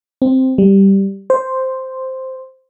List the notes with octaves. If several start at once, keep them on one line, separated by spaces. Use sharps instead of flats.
C4
G3
C5